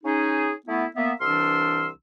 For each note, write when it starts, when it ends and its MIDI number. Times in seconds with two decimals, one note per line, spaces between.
0.04 0.52 61
0.04 0.52 63
0.04 0.52 68
0.66 0.84 57
0.66 0.84 59
0.66 0.84 64
0.96 1.12 58
0.96 1.12 59
0.96 1.12 76
1.21 1.87 36
1.21 1.87 52
1.21 1.87 62
1.21 1.87 84
1.21 1.87 88
1.21 1.87 89